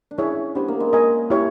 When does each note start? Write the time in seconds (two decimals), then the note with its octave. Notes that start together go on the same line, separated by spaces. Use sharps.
0.11 D4
0.18 C#4 E4 G#4 C#5 E5
0.55 B3 D4 G4 C5
0.68 A#3
0.80 G#3
0.93 A#4 D#5 G#5
1.30 E4 G4 A#4 C#5